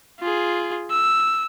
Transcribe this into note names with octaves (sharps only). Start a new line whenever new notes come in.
F4 G#4
E6